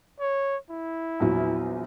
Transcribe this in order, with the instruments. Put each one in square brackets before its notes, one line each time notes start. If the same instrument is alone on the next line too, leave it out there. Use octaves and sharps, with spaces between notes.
[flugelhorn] C#5
E4
[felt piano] A#1 E2 F#3